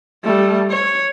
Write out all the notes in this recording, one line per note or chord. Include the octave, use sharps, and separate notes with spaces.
G3 A3
C#5